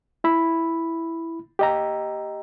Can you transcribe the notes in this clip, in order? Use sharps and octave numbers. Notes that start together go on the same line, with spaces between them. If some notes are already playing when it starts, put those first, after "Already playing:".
E4 B5
G4 D#5 A#5